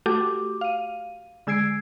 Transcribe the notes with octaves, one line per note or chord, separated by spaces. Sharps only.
A3 F#4 G4 A4 D6
F5 D#7
D3 G#3 E6 G#6 C7 D7